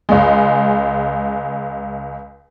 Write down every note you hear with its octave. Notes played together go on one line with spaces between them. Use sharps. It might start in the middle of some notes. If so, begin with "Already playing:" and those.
C#2 G#3